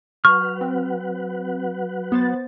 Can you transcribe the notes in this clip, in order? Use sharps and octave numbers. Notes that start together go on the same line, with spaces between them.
F#3 B4 F#5 C#6 F6
C4
B3 C5 A6